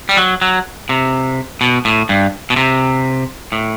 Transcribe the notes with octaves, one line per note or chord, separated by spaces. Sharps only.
G3
F#3
F#3
C3
B2
A2
G2
B2
C3
A2